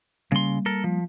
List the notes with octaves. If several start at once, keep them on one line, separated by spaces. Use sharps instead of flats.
C#3 G3 A#3 C6
A4 A#4
F3